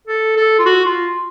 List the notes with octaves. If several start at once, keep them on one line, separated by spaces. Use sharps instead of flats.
A4
A4
F4
F#4
F4